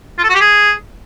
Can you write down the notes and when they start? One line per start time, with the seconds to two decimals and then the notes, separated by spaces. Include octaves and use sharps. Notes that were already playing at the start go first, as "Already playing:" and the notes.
0.18 F4
0.24 A4
0.29 F#4
0.35 G4
0.40 G#4